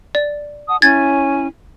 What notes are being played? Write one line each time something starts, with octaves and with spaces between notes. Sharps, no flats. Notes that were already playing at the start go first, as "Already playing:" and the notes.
D5
F#5 A5 D#6
C#4 E4 G#5 G#6 A6